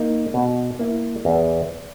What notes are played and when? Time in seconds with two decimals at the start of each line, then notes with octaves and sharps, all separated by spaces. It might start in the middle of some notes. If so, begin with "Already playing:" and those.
Already playing: A#3 D#4
0.34 B2
0.79 A#3 E4
1.25 E2